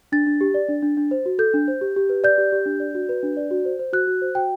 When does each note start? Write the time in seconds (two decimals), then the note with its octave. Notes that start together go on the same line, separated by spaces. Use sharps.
0.12 D4 A6
0.27 D4
0.41 G4
0.54 D5
0.69 D4
0.82 D4
0.97 D4
1.11 C5
1.26 F#4
1.39 A4 G6
1.54 D4
1.68 C5
1.81 G4
1.96 G4
2.09 B4
2.24 D5 G6
2.38 G4
2.52 G4
2.66 D4
2.80 D5
2.95 F#4
3.09 B4
3.23 D4
3.37 D5
3.51 F#4
3.65 C5
3.79 C5
3.93 F#4 F#6
4.07 F#4
4.22 C5
4.35 F#4 G5